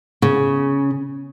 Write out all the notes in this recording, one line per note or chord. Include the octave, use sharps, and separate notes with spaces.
C#3